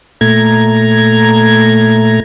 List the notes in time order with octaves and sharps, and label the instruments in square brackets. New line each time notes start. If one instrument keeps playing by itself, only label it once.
[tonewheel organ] A#2 A3 A#5 G#6